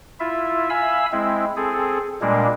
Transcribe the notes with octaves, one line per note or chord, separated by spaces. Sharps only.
E4 F4 E5
E5 F5 G#5 B5 E6
G#3 C4 E4
C4 G#4 A4
A#2 G3 G#3 A#3 D4